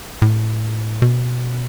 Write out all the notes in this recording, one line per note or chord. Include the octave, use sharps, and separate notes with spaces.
A2
B2